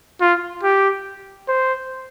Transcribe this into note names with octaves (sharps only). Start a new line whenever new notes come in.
F4
G4
C5